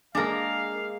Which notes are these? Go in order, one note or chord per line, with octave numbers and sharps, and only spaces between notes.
G#3 A#3 D4 A#4 F5